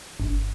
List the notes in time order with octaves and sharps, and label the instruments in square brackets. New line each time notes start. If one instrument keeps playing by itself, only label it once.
[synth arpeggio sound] G1